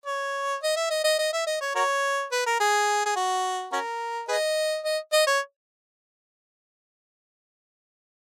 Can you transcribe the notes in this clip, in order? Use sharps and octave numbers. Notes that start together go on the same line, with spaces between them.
C#5
D#5
E5
D#5
D#5
D#5
E5
D#5
C#5
F#4 A#4 C#5
B4
A#4
G#4
G#4
F#4
C#4 F#4 A#4
G#4 B4 D#5
D#5
D#5
C#5